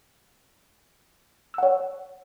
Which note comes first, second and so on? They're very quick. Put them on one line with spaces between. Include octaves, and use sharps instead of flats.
E6 F#5 C#5